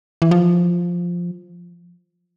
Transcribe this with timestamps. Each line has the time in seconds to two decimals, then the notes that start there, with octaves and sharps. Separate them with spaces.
0.22 E3
0.31 F3